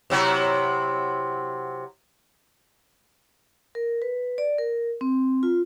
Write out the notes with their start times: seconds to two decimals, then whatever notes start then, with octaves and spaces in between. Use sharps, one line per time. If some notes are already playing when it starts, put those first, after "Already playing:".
0.10 C3 F#3 E4
3.75 A#4
4.02 B4
4.38 D5
4.58 A#4
5.01 C4
5.43 F4